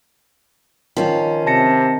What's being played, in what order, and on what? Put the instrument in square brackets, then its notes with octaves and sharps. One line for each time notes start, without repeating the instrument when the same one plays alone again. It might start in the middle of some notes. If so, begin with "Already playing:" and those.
[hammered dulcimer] D#3 [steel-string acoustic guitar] F3 C#4
[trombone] C3 [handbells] A5 A#6 C#7